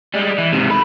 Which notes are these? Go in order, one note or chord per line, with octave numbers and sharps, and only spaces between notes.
G3 G#3
E3
G#2 C3
A4 B5